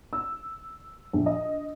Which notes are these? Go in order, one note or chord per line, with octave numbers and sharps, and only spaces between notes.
E6
A#1
D#5